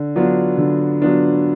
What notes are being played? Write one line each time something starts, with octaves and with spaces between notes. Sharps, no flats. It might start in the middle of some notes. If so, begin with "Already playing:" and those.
Already playing: D3
F#3 B3 D4 F4
D3
F#3 B3 D4 F4